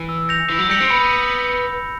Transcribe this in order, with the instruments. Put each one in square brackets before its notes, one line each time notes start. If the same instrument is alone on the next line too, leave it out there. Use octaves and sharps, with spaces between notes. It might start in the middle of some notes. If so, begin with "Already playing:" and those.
Already playing: [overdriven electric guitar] E3
[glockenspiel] E6
G6 A#6 C#7 F7
[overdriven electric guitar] E3 [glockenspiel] E6
[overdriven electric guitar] F#3
[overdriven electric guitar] G3 [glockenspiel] G6 A#6 C#7 F7
[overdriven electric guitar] C4
[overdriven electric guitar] B3 [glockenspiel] B5